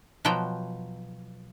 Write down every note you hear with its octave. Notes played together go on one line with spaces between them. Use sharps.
B2 F3 F#3 G5